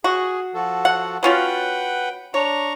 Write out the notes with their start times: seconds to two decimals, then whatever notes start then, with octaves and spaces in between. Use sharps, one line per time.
0.04 F#4 G#4
0.54 F3 F#4 A4
0.85 F#5
1.23 F#3 C#4 F4 B4 F#5 G5
2.34 D4 C#5 A#5 C#6